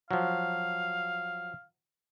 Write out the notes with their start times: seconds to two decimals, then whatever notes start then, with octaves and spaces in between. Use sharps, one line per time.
0.11 F3 F#3 F5